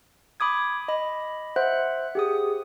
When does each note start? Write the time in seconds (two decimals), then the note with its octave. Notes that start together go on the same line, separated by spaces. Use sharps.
0.40 B5 D6 D#6 G#6
0.88 D#5 B5
1.56 C5 E5 F#5 F#6
2.15 G4 G#4 D#6